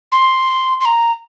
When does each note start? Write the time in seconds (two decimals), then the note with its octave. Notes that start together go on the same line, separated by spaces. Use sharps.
0.12 C6
0.81 C6
0.85 A#5